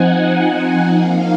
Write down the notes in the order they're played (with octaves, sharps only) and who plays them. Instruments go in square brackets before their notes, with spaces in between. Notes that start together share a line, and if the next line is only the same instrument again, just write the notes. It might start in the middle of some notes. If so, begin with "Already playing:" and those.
Already playing: [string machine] F3 C4 D#4 F#5 G#5
F3 A#3 D#4 F5